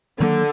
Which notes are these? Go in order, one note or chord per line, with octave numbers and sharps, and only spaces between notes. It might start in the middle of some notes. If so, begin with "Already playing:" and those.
D3 D#3 F#3 A#3